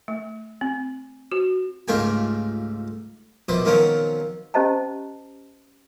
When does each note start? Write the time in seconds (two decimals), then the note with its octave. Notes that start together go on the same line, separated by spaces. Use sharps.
0.08 A3
0.61 C4
1.32 F#4
1.88 C#2 G#2 A3 F4 G4 G#5
3.49 A#1 B2 B4 C5
3.65 B2 D#3 F3 F#3 C4 C#4
4.54 C#4 G4 C5 D#5 A5 A#5